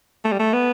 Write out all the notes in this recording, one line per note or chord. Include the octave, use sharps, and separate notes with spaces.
A3
G3
A3
B3